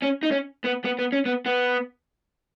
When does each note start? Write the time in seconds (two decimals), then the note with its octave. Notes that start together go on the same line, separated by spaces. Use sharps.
0.03 C#4
0.23 D#4
0.31 C#4
0.64 B3
0.84 B3
0.99 B3
1.12 C#4
1.26 B3
1.46 B3